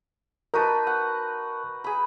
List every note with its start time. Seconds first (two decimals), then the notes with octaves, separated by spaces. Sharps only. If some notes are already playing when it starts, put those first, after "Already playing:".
0.54 D#4 F#4 A#4 B4 A5
0.87 F#5
1.84 G#4 B5